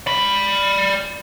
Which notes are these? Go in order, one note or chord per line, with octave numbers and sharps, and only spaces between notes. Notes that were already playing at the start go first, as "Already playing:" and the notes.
D5 B5